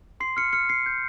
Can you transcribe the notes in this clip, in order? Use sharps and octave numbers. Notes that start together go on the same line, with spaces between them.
C6 C7
F6 C#7
F6 C#7
F6 C7
G6